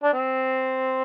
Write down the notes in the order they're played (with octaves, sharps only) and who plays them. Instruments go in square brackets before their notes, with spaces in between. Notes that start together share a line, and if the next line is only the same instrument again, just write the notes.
[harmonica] D4
C4